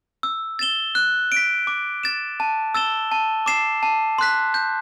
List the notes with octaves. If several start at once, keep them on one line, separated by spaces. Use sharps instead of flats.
E6
A6 E7 G7
F#6
B6 D7
D6
A6 E7
A5
E6 A6 E7 G7
A5
D6 A6 C7 E7
A5
C6 F#6 B6
G6